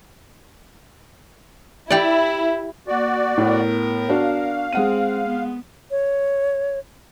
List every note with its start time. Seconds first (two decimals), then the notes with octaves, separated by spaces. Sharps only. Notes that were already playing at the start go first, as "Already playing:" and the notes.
1.90 E4 G4 D5
2.88 A#3 F#4 D5
3.38 A2 B3 A#4
4.09 D4 F#4 F5
4.73 G#3 C4 F#5 D#7
5.27 B3
5.91 C#5